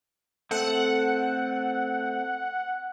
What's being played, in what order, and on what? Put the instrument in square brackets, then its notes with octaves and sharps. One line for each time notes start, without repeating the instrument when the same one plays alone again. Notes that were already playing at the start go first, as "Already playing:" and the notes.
[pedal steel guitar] A3 C4 A4 [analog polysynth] F#5